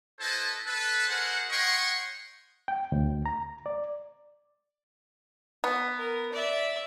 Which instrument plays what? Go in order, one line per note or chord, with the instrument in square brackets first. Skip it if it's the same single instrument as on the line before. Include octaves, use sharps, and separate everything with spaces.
[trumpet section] E4 A4 B4 C5 D#5 A5
A4 B4
F#4 G#4 A#4 C5 F#5
C#5 D#5 F#5 G5 C6 C#6
[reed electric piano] G5
D2
A#5
D5
[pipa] B3
[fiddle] A#4
D5 E5